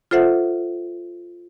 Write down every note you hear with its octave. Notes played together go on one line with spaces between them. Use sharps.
F4 A4 C5 E5 F#5